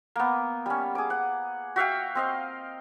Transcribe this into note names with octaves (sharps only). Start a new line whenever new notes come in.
A#3 B3
G3 C#4
G#4 D6
F#5
F#4 E5 F5 G5
C4 D#5 F5